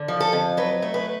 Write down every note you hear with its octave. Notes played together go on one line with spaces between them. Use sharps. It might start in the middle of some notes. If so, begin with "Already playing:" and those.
Already playing: D3
F3
A4
F2
F#3 B4
A3
B4